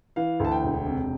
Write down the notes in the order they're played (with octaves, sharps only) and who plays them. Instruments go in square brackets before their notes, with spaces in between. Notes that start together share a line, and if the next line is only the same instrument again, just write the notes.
[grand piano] E3 F5
D2 A5
G5
E1
C3